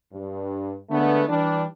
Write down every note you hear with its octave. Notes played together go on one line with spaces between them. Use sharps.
G2
D3 G#3 A3 B3
E3 G3 D4